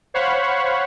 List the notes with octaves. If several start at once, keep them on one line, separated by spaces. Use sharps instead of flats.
C5 C#5 F5 F#5 B5 C#6